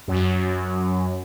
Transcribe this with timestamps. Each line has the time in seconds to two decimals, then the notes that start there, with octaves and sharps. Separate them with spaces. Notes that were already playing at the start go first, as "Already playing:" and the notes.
0.08 F#2